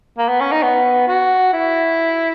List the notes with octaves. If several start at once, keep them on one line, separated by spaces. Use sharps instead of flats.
A#3
B3
C#4
D#4
B3
F#4
E4